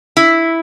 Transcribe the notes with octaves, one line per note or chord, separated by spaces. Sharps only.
E4